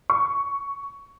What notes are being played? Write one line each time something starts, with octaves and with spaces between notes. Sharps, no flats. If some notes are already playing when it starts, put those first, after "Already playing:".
C#6